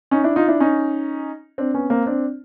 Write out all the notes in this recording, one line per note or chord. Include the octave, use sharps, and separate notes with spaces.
C#4 D#4
D4 E4
D#4 F4
D4 E4
C#4 D#4
C4 D4
B3 C#4
A#3 C4
C4 D4